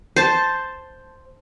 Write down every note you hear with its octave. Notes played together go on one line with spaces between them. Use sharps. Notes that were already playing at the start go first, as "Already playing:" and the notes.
C5 A5